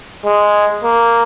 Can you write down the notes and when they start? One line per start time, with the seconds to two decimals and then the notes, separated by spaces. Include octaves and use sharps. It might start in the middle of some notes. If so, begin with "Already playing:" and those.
0.25 G#3
0.84 A#3